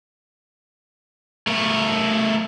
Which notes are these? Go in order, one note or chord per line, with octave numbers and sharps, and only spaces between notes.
A3 A#4